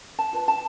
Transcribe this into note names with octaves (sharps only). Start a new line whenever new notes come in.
A5
F4 B4
A5